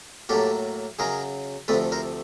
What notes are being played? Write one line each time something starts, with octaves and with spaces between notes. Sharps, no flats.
A2 F#3 A#3 G4 A4
F#2 C#3 F#3 G#4 A#4
D2 C3 F3 A3 A4 B4
A#4 C5